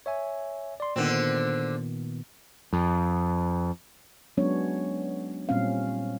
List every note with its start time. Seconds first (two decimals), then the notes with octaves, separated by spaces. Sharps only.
0.06 C#5 E5 G#5
0.80 D5 C6
0.96 A#2 D3 D#3 B3 C4
2.73 F2
4.37 F#3 G#3 B3 C#4 D4 C#5
5.49 A#2 G3 C4 C#4 F5